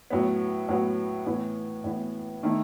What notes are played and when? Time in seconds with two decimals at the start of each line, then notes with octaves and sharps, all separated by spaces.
0.10 A2 F#3 B3
0.68 A2 F#3 B3
1.26 A2 E3 B3
1.84 A2 E3 B3
2.43 D#3 A3 E4